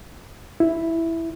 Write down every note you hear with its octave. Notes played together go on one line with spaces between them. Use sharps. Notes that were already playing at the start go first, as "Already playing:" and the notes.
E4